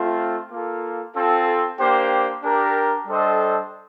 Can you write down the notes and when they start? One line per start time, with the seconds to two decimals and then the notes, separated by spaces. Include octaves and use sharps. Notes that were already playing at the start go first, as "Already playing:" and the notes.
Already playing: A3 C4 F4
0.50 A#3 F4 A4
1.14 C4 F4 A4
1.78 A#3 D4 G4 C5 G5
2.42 D4 G4 A#4
3.06 G3 D4 A4 C5 D#5